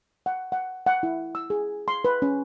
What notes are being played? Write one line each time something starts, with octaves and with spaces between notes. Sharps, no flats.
F#5
F#5
F#5
E4
E6
G#4
C6
B4
C#4